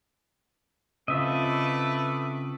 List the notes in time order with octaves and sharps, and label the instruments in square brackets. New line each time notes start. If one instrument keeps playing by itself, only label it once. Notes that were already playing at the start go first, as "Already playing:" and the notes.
[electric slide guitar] C#3 C4 F4 [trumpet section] A3 B4 D6 [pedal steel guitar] D#5 E5